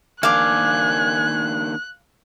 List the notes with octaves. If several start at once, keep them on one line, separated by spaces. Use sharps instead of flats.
D#3 A#3 D4 F5 G#5 D6 F#6